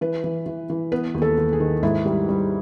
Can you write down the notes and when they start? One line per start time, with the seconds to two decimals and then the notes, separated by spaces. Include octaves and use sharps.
0.01 E3 B4
0.24 E3
0.46 E3
0.70 E3
0.92 B3 B4
1.14 D#2
1.22 A4
1.38 D#2
1.53 G#4
1.60 D#3
1.83 G#2 E4
2.05 G3
2.29 G3